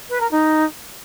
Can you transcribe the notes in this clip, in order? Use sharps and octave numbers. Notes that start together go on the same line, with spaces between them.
B4
A#4
D#4